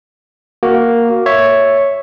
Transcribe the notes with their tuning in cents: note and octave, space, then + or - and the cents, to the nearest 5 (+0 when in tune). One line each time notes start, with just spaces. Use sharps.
A#3 +0 F#4 +0
C#5 +0 E5 +0